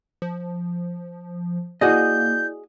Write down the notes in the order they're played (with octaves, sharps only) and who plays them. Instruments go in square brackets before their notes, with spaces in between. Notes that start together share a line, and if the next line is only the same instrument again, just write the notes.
[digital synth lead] F3
[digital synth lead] A#3 [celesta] E4 D5 [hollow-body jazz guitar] F#4 G#4 D#5 [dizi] G6